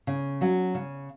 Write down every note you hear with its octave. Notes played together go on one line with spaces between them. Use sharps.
C#3
F#3 C#4
C#3